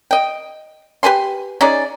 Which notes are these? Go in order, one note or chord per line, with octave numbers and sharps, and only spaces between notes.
D#5 G5
G4 B4 G#5 C6
C#4 D#4 G#4 D5